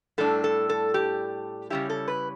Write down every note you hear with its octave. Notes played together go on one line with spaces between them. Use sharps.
A2 G3 D4 A4
A4
A4
G4
C#3 G3 C#4 E4 G4
A4
B4